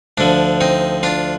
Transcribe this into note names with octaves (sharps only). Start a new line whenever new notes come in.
D2 D3 F3 D4
C4 D#4
D4 F4